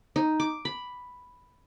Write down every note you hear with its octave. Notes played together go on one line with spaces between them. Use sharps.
D#4
D6
B5